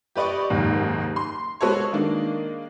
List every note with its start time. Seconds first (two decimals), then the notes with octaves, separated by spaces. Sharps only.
0.16 G4 B4 D5 D#5 C#6
0.50 F#1 D#2 G#2
1.16 C6
1.61 G#3 B3 F#4 A4 C#5
1.92 D#3 G#3 A#3 D4